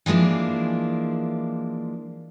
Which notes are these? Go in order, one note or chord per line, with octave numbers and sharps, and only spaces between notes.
E3 F3 G#3 A#3 D4